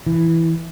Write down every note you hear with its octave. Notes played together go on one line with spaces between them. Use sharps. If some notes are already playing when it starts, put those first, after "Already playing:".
E3